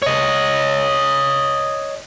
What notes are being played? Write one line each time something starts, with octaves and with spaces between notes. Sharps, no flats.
C#5 D#5